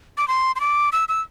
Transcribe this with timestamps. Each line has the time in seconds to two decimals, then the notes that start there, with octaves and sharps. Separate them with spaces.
0.18 D6
0.28 C6
0.56 C6
0.60 D6
0.93 E6
1.09 E6